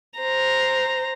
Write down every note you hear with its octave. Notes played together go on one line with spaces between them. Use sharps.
C5 A#5